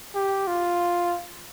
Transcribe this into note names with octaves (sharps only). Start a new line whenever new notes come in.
G4
F4